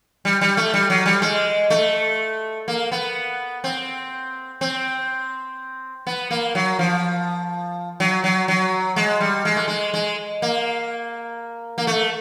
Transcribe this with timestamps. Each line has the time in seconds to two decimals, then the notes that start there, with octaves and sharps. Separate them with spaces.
0.25 G3
0.41 G3
0.57 A3
0.74 G3
0.90 F#3
1.06 G3
1.22 G#3
1.70 A3
2.68 A#3
2.92 B3
3.64 C4
4.61 C4
6.07 B3
6.31 A#3
6.55 F#3
6.79 F3
8.00 F#3
8.24 F#3
8.48 F#3
8.96 G#3
9.21 G3
9.45 G#3
9.56 A3
9.68 G#3
9.94 G#3
10.42 A#3
11.78 A#3
11.87 A3